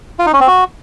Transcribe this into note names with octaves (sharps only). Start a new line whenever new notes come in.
F4
D#4
C#4
C4
F#4